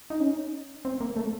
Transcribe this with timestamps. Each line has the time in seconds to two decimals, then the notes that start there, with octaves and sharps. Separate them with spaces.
0.10 D#4
0.20 C#4
0.85 C4
1.01 A#3
1.16 A3